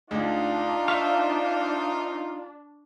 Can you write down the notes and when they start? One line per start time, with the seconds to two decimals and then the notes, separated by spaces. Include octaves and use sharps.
0.11 D2 G#3 D4 D#4 F4
0.88 C5 E5 F5 C#6